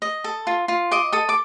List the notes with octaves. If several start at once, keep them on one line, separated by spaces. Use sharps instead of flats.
D#5
A4
F4
F4
D#5 D6
A4 D#6
D6